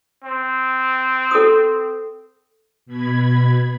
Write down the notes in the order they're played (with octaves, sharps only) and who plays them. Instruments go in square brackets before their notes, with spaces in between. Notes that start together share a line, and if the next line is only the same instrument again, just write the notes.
[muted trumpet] C4
[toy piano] A4 D#6
[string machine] B2 B5 G#6